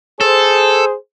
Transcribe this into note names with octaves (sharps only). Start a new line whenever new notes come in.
G#4 A4 C5